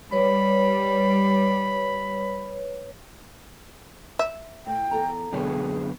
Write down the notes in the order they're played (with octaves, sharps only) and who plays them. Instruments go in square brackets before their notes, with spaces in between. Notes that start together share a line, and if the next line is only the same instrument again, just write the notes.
[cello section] G3 [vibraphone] B4 C#5 [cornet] B5
[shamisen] E5
[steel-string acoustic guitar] A2 [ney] G5
[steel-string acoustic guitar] E2 A4 A#5
[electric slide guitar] F#2 D3 B3 [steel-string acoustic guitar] B2 C#5 G5 [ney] G#4